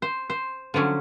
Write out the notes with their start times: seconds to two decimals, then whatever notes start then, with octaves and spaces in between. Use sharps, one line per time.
0.02 C5
0.30 C5
0.74 D3 F3 F#3 C#4